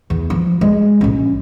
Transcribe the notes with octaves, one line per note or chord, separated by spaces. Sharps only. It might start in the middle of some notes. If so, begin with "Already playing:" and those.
E2
F3
G#3
A#1 C#4